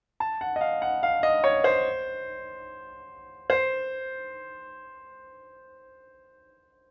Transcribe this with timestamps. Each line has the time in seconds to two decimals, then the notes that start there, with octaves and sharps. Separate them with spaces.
0.20 A5
0.41 F#5
0.56 D#5
0.61 F5
0.82 F#5
1.03 F5
1.23 D#5
1.44 C#5
1.64 C5
3.50 C5